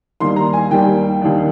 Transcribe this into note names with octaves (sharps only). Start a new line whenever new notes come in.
D#2 D#3 G3 A#3 C6
A#5
G#5
D#2 D#3 G3 A#3 G5
D#2 D#3 G3 D4